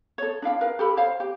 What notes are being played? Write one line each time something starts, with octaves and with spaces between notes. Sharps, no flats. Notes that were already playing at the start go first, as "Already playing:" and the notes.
A4 C#5
D4 E4 F5 G5
A#4 B4 F5
G4 A4 B5
C5 C#5 F5 G5
G4